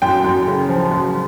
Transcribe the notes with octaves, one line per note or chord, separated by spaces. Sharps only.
F#2 G5
F#2
C#3
F3
F#2